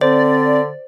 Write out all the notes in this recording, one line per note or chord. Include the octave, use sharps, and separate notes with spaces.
D3 C4 C5 D5